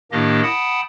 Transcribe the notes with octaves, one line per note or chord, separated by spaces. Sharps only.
A2 D#3 A#3 D4 G4 D#5
F#5 G5 A5 B5 D#6